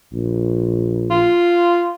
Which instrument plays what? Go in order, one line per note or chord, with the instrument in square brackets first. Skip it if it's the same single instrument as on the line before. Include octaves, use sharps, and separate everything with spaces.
[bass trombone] A#1
[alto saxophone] F4